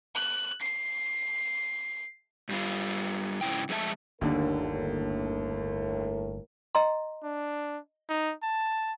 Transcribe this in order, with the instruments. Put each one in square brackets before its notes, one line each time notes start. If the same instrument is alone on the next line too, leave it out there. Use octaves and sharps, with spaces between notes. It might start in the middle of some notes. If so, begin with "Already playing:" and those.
[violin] F#6
C7
[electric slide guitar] G2 G3 F4
G#2 C#3 E4 G5
F2 G#3 B3 E4 E5 A5
[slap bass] G1 A#3 D4 [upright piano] D#2 D3 [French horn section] A2 A#4
[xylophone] D#5 A#5 C6
[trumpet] D4
D#4
A5